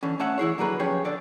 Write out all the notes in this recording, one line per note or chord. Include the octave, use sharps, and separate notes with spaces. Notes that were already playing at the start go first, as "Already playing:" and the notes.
D3 E3 C#4
A3 C#4 E5 F#5
E3 E4 G#4 C#5
D3 F#3 A#3 G#4 B4
F3 C#4 G4 G#4 C#5
D3 D5 A5